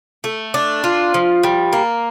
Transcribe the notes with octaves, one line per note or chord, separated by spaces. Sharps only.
A3
D4
F4
F3
G3
A#3